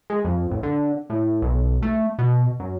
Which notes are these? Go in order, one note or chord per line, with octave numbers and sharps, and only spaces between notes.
G#3
F2
A1
D3
A2
B1
A3
B2
F#2